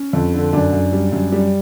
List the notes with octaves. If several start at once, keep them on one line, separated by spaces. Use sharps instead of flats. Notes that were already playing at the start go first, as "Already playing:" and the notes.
Already playing: C#4
F2
D3
F#2 D4
F#2
G3
F#2
G3